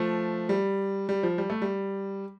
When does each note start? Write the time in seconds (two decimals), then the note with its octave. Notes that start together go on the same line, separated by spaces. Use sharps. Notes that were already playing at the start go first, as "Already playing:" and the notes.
Already playing: F3 A3
0.49 G3
1.09 G3
1.23 F3
1.38 G3
1.50 A3
1.62 G3